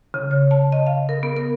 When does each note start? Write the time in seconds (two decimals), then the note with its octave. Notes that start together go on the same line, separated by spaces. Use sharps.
0.14 C#3
0.31 C#5
0.51 A5
0.72 D#5
0.87 F5
1.09 A#4
1.23 B3
1.36 A#4